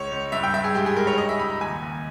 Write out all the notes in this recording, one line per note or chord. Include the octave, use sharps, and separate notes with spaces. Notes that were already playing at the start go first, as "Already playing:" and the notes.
Already playing: C#2 C#5
C#2
G2 E5
G5
G2 E5
G#4
G#2 G4
G#4
G#2 A#4
C#5
G3 D#5
E5
C#2 B5
A#5
D#2 G#5
D#2